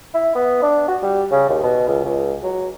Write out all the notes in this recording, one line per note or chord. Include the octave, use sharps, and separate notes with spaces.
E4
B3
D4
F#4
G3
C#3
D#2
B2
C#2
C#2
F#3